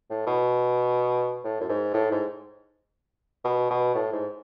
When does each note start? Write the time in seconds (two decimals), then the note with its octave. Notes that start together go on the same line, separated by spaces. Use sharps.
0.10 A2
0.27 B2
1.44 A2
1.60 F#2
1.69 G#2
1.94 A2
2.11 G#2
3.45 B2
3.71 B2
3.95 A2
4.13 G#2